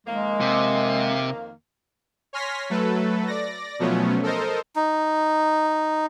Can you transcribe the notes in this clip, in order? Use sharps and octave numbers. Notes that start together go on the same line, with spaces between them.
F2 D#3 G#3 A#3
C3
C#5 G#5 C6 F6 A#6 B6
F#3 A3 A4 B4
D5 A#6
B2 F3 F#3 A3 B3 C#4
A4 A#4 C5 D#5
D#4